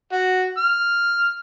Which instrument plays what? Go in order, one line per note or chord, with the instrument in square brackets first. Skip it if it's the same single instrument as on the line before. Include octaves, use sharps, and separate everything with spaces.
[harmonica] F#4
F6